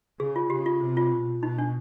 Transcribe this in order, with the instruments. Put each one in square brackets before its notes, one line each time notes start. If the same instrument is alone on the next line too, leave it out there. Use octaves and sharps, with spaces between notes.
[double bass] C#3 [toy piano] G#4
[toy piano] F4
[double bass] C#3 [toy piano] G4
[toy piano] F4
[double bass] C3
[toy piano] F4
[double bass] B2
[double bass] B2 [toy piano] D#4
[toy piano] D4